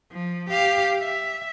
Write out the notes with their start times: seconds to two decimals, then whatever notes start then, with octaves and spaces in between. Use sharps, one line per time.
0.12 F3
0.49 G4 F5
1.02 E5